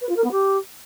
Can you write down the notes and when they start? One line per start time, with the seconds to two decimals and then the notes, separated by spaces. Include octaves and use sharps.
0.01 B4
0.09 F4
0.16 A#4
0.24 B3
0.31 G4